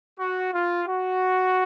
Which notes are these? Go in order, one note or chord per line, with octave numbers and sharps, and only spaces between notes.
F#4
F4
F#4